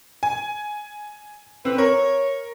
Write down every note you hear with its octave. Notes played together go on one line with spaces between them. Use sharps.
G#5
D3 C4 B4
A#4 C#5